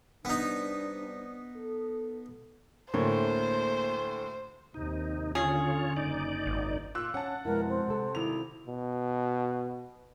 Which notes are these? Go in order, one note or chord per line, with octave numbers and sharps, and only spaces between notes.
C3 G3 B3 D4 D#4
A4
D2 A2 A#3 C5 C#5
D#2 C3 D#4
D3 C#4 F4 G#4 C#5
F#1 D#4 D5
G#1
A#2 E6 F#6
C#4 F#5 A5
F2 B2 G#3 E4 A#4
C4
C3 A4
G#1 E4 F7
B2